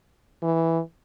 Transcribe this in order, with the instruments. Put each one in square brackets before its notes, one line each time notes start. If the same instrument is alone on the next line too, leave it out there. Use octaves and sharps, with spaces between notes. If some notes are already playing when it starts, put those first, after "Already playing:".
[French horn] E3